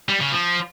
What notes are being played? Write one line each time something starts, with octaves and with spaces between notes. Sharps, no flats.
G3
C#3
F3